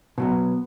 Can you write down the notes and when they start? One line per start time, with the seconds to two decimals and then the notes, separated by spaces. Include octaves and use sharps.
0.18 B2 F#3 B3